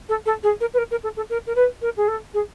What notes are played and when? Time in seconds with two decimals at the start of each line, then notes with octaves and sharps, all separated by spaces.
0.09 A4
0.26 A4
0.43 G#4
0.61 A#4
0.74 B4
0.78 A#4
0.91 A#4
1.03 A4
1.17 A4
1.30 A#4
1.47 A#4
1.56 B4
1.82 A#4
1.97 G#4
2.08 A4
2.34 G#4